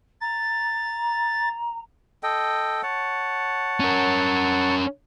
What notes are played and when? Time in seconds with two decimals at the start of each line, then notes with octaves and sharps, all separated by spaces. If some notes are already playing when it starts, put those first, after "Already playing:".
0.21 A#5 A6
2.23 A4 D#5 G5
2.83 C#5 F#5 A5
3.80 C#4 A#4